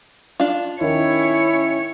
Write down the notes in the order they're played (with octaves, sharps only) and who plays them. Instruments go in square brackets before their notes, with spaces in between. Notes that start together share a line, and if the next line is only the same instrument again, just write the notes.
[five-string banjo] D4 F4
[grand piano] D#3 [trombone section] C#4 E4 [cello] C#5